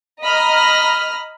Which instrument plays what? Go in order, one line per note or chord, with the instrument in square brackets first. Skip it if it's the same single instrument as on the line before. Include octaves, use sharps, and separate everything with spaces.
[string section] D#5 A#5 B5 F6